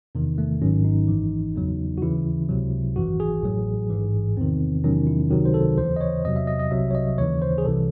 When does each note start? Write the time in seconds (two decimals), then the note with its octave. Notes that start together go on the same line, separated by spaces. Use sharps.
0.15 E2 C3 D#3
0.38 A3
0.61 G#1 G#2 D#3 F#3 C#4
0.85 D#4
1.08 G#1 F#2 E3
1.55 E2 C#3 F#3
1.98 F#4
2.02 D#2 C#3 E3 E4
2.49 C#2 C3 F#3
2.96 G#1 F#2 E3 F#4
3.20 G#4
3.43 A1 A2 F#3
3.90 A1 G#2 E3
4.37 E2 C3 D#3 C4
4.84 E2 C3 D#3 F#3 C#4
5.07 E4
5.30 C#2 C3 D#3 F#3 F#4
5.45 C5
5.54 A4
5.78 D#2 C#3 E3 C5
5.96 D#5
6.01 C#5
6.25 E2 C3 F#3 D#5
6.36 E5
6.47 D#5
6.59 D#5
6.71 C2 C3 F#3 E5
6.91 C#5
6.95 D#5
7.18 D#2 C#3 E3 C#5
7.42 C5
7.58 G#4
7.65 C2 C3 E3 A4